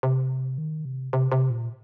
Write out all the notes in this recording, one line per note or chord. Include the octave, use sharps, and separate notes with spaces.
C3
D#3
C3
C3
C3
A#2